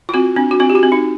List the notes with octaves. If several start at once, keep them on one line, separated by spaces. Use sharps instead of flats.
F4
C4 F#4
C4 D4
F#4
C4 F4
G4
F#4
C4
D#4